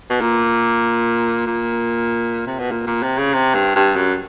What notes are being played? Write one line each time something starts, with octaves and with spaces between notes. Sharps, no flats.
B2
A#2
A#2
C3
B2
A#2
A#2
C3
C#3
C3
G2
G2
F#2